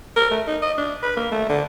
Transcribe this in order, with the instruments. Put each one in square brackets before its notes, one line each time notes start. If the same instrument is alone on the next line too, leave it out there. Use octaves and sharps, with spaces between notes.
[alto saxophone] A#4
A3
D#4
D#5
D4
B4
A#3
A3
D3